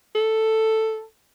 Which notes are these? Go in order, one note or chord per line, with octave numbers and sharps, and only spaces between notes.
A4